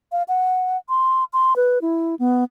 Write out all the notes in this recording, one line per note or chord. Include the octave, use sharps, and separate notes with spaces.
F5
F#5
C6
C6
B4
E4
B3